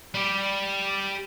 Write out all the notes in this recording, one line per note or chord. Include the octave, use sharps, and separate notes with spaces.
G3 G4